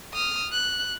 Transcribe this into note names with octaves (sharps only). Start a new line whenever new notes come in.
D#6 F6
F#6